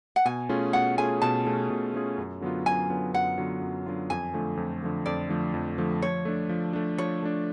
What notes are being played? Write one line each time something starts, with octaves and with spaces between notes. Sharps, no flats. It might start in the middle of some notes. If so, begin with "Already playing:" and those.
F#5
B2 G#5
A3 C#4 F4 G#4
B2 F#5
A3 C#4 F4 G#4 G#5
B2 A5
A3 C#4 F4 G#4
B2
A3 C#4 F4 G#4
F#2
D3 F#3 B3 F4
F#2 G#5
D3 F#3 B3 F4
F#2 F#5
D3 F#3 B3 F4
F#2
D3 F#3 B3 F4
F2 G#5
D3 F3 A3
F2
D3 F3 A3
F2 D5
D3 F3 A3
F2
D3 F3 A3
F3 C#5
A3 D4
F3
A3 D4
F3 C#5
A3 D4